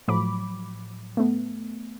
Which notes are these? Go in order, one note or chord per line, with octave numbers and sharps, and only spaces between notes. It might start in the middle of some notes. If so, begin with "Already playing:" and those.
A2 F3 F#3 B5 D6
A3 B3